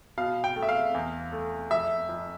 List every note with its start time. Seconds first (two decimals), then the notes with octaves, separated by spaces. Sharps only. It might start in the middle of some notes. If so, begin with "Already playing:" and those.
0.18 B2 F5
0.44 G5
0.56 A3
0.63 E5
0.69 F5
0.94 E2
1.32 A3
1.71 F2 E5
2.09 F2